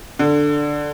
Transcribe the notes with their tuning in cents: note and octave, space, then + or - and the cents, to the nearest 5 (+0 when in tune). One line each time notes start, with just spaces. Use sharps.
D3 +5